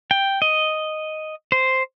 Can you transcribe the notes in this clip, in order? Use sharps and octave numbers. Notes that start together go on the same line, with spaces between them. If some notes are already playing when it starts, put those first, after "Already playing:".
G5
D#5
C5